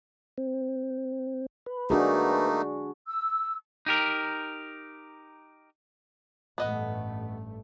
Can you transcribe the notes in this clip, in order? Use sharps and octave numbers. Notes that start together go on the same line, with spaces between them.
C4
B4
A3 A#3 D4 D#4 F#4 G#4
E6
D#4 G4 A#4
A1 G2 A3 B3 D#5 F#5